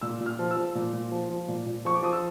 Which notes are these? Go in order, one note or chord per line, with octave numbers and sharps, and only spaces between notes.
A#2 E6
A#2
F6
F3
E6
F3
A#2
A#2
F3
F3
A#2
A#2
F3 C#6
D6
F3 D#6
E6